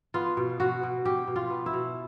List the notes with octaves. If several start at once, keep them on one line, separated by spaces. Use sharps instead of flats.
B3 F4
B2
B2 F#4
B2
B2 G4
B2
F4
B3
E4
B2